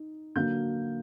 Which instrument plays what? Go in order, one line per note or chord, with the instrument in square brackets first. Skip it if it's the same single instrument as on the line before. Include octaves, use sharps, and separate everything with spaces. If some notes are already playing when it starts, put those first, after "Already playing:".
Already playing: [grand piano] D#4
D3 F#3 A#3 G6